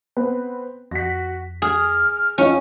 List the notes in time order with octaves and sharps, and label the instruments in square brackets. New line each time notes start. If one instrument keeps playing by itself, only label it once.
[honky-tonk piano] B3 C4 B4
[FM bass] F2 [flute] F#4 [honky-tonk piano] A#6 B6
[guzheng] G#4 [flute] F6
[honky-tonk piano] F2 D#4 F4 [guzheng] C#4